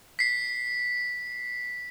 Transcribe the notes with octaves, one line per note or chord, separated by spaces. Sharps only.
B6 C7